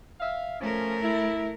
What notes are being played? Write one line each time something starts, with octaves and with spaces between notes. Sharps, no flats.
E5 F5
F3 A3 C#4 A#4
E4